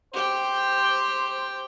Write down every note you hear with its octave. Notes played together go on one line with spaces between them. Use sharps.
G4 C5 G5